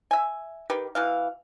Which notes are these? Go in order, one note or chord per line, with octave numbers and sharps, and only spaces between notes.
E5 G#5
D#3 G4 B4
B2 E3 F5